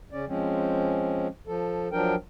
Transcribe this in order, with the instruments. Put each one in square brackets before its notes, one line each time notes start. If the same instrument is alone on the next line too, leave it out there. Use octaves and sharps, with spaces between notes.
[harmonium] C#3 C#4 D5
F3 G#3 C4 C#4
F3 A4
F3 F#3 D4 A#4 G5